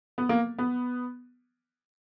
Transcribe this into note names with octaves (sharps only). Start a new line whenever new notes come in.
B3
A#3
B3